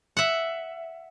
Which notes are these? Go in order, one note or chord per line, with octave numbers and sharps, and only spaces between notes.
E5 F#5